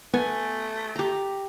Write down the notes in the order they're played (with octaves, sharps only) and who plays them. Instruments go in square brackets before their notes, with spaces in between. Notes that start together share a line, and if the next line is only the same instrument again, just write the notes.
[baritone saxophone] A3 [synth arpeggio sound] B3 [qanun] G#5
[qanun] G4 A#5